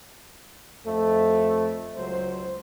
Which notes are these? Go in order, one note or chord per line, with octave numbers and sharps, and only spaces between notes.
F2 A3
C#2 F#3 C5